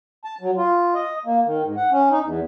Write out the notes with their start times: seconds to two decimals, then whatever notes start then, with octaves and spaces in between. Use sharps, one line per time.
0.24 A5
0.41 F#3
0.57 F4
0.95 D#5
1.26 A#3
1.46 D#3
1.64 G#2
1.76 F#5
1.91 C#4
2.11 D#4
2.23 E2